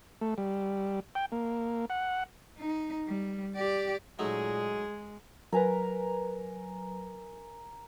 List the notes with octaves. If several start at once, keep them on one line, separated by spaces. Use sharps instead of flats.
A3
G3
G5
A#3
F#5
D#4
G3
G4 D5
A#2 F#3 G#3 A3 D#4 G#4
F#3 A#4 B4 G#5 A#5